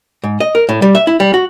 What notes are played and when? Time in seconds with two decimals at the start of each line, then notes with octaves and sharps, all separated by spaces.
0.24 G#2
0.40 D#5
0.55 A#4
0.69 A2
0.82 G3
0.95 E5
1.07 E4
1.20 G3
1.34 F#4